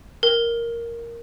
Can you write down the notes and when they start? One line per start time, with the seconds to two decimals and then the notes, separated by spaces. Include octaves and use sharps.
0.23 A#4